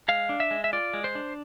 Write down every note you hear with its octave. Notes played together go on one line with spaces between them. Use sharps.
G#3 F5
D4
E5
G#3
E5
F4 D5
G#3
C5
D4